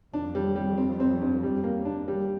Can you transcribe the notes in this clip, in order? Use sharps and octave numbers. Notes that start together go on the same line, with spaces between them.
F2 D4
G3
G3
C4
C4
G2
G3
A#3
D4
G3